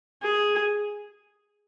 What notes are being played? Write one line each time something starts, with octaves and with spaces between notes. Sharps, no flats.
G#4